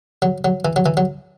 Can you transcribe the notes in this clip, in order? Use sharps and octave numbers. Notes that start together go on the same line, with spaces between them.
F#3
F#3
E3
F#3
E3
F#3